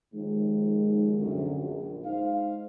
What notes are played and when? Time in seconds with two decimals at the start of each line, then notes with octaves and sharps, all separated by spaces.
0.13 D#2 G#2 D#3 F3 G#3
1.18 C2 F#2 D3
1.59 A#1
2.05 G#3 D#4 C5 F5